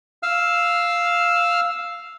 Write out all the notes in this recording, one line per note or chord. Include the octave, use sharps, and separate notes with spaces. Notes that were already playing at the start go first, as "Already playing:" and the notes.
F5 E6 F6